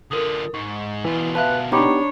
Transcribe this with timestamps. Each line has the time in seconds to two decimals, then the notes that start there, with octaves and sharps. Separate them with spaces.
0.11 D3 F4 A4 A#4 D#6
0.54 G#2 C#6
1.05 B2 E3 F4
1.35 B4 E5 F5 A5 F#6
1.72 B3 D4 D#4 G4 C#5 A#5 B5 D6